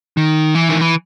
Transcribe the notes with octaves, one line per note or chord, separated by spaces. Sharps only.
D#3
E3
D#3
E3